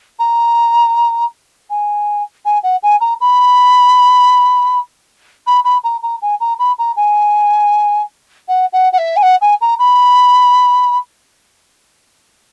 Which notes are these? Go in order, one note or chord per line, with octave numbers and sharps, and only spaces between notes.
A#5
G#5
G#5
F#5
G#5
A#5
B5
B5
B5
A#5
A#5
G#5
A#5
B5
A#5
G#5
F#5
F#5
F#5
E5
G#5
F#5
G#5
A#5
B5